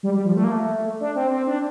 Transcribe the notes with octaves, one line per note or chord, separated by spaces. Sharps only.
G3
G3
F3
A3
A#3
A3
D4
C4
C4
D4